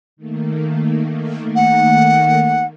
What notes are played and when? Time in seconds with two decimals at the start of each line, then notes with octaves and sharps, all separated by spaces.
0.16 D#3 A3 A#3
1.56 F#5